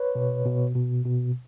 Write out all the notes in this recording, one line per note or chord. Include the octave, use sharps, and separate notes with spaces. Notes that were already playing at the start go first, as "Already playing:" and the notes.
Already playing: B4 C#5
B2
B2
B2
B2